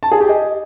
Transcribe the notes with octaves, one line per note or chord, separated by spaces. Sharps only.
A5
G#4
G4
D#5